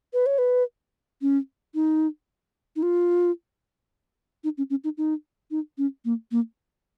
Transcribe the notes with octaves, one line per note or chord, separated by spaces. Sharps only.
B4
C#5
B4
C#4
D#4
D#4
F4
D#4
C#4
C#4
D#4
D#4
D#4
C#4
A#3
A#3